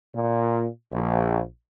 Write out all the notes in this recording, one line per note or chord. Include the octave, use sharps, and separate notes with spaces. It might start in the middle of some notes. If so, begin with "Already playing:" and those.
A#2
A#1